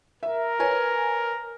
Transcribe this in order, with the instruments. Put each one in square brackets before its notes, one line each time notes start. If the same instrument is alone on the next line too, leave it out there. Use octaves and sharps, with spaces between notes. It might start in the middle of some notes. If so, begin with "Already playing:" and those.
[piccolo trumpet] A#4 [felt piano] E5
[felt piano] B4 C#5 G#5